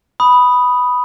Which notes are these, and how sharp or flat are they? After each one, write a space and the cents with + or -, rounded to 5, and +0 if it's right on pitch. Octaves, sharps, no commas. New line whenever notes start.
B5 +0 D#6 +0